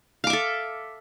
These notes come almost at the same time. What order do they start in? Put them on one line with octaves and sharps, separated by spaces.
F5 D6 E5 A4